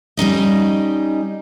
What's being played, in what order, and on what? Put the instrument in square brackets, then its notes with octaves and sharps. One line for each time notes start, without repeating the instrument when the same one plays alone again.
[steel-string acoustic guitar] G3 C#4 D#4 D#5